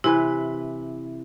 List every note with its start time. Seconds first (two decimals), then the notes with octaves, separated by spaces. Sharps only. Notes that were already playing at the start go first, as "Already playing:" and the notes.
0.04 C3 E3 E4 B4